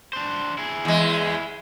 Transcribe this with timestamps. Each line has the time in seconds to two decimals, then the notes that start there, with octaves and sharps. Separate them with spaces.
0.13 D4 C5
0.58 E4 G#4
0.85 E2 G#3